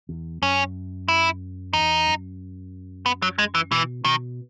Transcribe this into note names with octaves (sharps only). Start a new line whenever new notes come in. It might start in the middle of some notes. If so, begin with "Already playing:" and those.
E2
F#2 C#4
E4
E2 D#4
F#2
B3
F#3
G#3
E3
B2 E3
B2 D#3